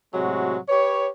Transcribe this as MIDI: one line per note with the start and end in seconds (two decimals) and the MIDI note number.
0.14 0.58 45
0.14 0.58 48
0.14 0.58 54
0.14 0.58 56
0.14 0.58 66
0.69 1.09 67
0.69 1.09 71
0.69 1.09 73